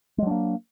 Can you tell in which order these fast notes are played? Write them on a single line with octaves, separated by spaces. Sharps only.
G#3 F#3 D4 A#3